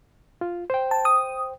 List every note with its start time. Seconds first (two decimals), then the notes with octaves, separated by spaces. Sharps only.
0.41 F4
0.70 C5 G5
0.91 A5
1.05 D#6